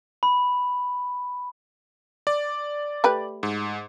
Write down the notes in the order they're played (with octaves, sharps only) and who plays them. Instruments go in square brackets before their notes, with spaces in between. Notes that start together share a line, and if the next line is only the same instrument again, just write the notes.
[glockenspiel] B5
[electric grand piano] D5
[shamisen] A3 G4 B4
[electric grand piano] G#2